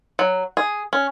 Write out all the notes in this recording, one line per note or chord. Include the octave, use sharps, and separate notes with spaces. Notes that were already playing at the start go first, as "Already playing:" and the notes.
F#3
G#4
C#4